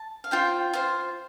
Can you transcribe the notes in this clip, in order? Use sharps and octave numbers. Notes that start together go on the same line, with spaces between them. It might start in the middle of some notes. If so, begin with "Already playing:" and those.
Already playing: A5
F5
F4 C5 G5
F4 C5